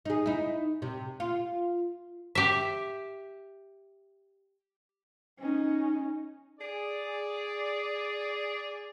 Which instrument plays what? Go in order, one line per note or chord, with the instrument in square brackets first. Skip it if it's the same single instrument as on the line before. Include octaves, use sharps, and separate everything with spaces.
[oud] D#4 G#4
D#4 E4
C3
F4
[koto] G4 E5
[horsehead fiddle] C#4 D#4
[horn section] G#4 D5